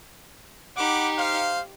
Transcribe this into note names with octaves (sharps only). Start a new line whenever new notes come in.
D#4 G4 F#5 B5 D6
C5 F5